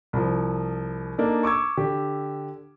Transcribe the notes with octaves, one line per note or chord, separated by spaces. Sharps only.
C2 F3
A#3 D4 D#4 A4
C#6 D6 E6 G#6
D3 G4